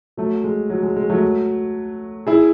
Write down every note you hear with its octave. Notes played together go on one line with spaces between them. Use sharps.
F#3 A3
G#3
F#3
G#3
G#3
F#3 A3
E4 G#4